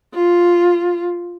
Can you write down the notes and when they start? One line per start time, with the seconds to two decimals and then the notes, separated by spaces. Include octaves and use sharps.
0.14 F4